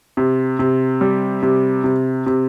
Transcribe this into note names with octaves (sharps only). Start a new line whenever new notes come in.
C3
C3
G3
C3
C3
C3